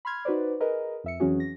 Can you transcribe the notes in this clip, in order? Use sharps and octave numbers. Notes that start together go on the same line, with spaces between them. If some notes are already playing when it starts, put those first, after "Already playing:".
B5 C6 F6 G#6
D#4 F#4 B4 C5 D5
G#4 A#4 B4 D#5
F2 E5 C#7
F2 E3 F#3 C#4 F#4 G#4
A#6